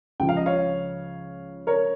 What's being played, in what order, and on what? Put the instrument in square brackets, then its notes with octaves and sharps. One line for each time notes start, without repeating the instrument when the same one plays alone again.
[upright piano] C#2 C#3 F3 G5
F5
D#5
C#5 F5
A#4 C#5